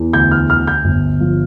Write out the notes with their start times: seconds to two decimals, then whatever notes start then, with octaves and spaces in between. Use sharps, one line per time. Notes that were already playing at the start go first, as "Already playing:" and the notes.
Already playing: E2
0.13 D2 G6
0.31 F6
0.49 D2 F6
0.67 G6
0.84 G1
1.20 F3